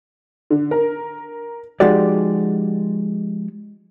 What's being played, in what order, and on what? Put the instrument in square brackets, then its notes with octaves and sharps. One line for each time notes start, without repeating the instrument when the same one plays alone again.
[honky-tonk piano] D3
A#4
[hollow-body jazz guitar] F3 G#3 D#4 F#4 G4 D5